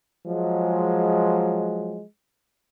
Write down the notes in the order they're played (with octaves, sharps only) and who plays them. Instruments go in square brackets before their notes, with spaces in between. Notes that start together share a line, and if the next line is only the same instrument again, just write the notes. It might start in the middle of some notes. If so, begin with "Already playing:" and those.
[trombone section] F3 F#3 G#3